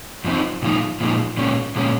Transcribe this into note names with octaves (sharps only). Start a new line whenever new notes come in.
F#2 F3 C4 D#4
A#2 F3 G#3 D#4
A#2 F3 G#3 D#4
A#2 G#3 C#4
A#2 G#3 C#4